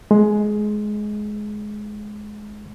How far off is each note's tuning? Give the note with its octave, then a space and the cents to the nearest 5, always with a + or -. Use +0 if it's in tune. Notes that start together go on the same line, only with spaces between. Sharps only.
G#3 +15